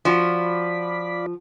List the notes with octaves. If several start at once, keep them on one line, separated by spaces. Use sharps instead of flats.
F3 F4 F#4 D5 B5